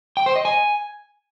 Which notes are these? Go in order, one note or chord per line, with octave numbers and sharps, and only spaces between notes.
G5
C5
D#5
G#5